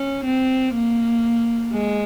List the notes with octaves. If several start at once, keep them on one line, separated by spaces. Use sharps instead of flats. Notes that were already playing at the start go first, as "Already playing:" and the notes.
Already playing: C#4
C4
A#3
G#3